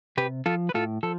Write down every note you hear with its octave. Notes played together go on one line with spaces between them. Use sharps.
C3 G4 B4
F3 F4 A4
B4
A2 F4 A4
F3 A4